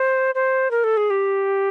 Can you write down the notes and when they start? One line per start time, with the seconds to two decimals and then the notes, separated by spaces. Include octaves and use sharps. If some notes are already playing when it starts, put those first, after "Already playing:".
Already playing: C5
0.35 C5
0.71 A#4
0.84 A4
0.97 G#4
1.10 G4